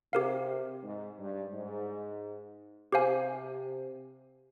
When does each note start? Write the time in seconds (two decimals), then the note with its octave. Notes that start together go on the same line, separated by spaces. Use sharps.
0.13 C3 G4 A#4 F5
0.83 G#2
1.18 G2
1.53 G#2
2.92 C3 G4 C5 F5 G#5